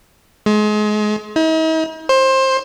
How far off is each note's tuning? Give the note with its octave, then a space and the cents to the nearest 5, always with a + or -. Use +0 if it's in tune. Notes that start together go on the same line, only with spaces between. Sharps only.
G#3 +30
D#4 +45
C5 +20